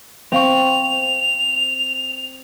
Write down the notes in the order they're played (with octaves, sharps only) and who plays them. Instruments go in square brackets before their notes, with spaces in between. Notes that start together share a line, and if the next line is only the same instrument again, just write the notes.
[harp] C4 [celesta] C5 F5 C#6 [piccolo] F7